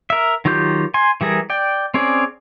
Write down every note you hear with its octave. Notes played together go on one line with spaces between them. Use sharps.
A#4 E5
D#3 F#3 F4 G4 G6
G#5 C6
E3 G3 G#4 A#4
D5 G5
C4 C#4 G#4 D5